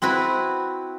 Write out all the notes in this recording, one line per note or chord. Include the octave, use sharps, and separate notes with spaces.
C4 E4 F#4 B4